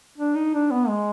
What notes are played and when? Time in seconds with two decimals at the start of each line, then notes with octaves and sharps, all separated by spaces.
0.18 D4
0.35 D#4
0.54 D4
0.71 B3
0.88 G#3